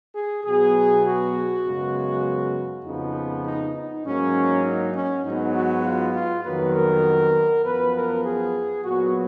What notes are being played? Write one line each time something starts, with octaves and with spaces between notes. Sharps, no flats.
G#4
B2 F#3 B3 G#4
F#4
F#2 C#3 G#3 B3
F2 C#3 F3 B3 D#4
D#4
D#4
G#2 F#3 A#3 C#4
D#4
C#4
G#2 F#3 B3 D#4
F#4
F4
F4
F2 D#3 F#3 B3 B4
A#4
F#2 F3 B3 B4
A#4
G#4
A#2 F#3 B3 F#4